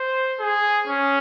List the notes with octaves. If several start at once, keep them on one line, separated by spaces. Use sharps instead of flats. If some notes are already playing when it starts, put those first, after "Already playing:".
Already playing: C5
G#4
C#4